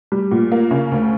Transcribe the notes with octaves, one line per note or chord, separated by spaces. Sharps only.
G3
A#2
A#3
C#3
D2